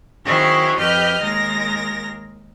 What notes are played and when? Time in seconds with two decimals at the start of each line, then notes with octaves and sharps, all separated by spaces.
0.25 D#3 F#3 C4 E4 G#4 C#5
0.78 F2 G4 B4 D#5 F6 G6
1.21 D#2 G#3 A#4 A#6